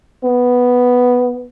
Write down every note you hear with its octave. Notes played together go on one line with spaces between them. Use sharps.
B3